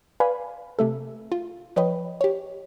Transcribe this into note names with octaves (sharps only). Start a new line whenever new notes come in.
B4 D5 F5 G#5 B5
C3 A3 A4
F4
F3 B4 C#5 D#5 G5 B5
G4 C#5